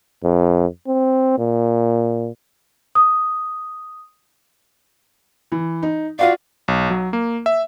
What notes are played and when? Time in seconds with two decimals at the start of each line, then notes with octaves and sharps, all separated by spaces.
0.24 F2
0.88 C4
1.38 A#2
2.95 D#6
5.52 E3
5.83 D#4
6.19 F4 F#4 D5 F5
6.68 B1
6.90 F#3
7.13 A#3
7.46 E5